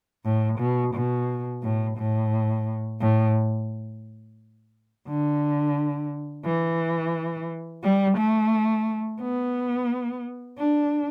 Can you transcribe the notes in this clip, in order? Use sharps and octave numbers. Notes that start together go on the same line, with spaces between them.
A2
B2
B2
A2
A2
A2
D3
E3
G3
A3
B3
D4